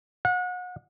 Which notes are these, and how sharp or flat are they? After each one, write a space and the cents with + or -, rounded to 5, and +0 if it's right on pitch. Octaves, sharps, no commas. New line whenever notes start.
F#5 -35